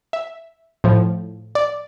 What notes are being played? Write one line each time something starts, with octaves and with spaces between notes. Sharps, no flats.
E5
A2 F3
D5